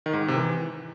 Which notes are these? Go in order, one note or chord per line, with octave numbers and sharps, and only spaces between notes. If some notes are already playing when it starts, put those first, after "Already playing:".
D#3
G#2
D#3
C3
E3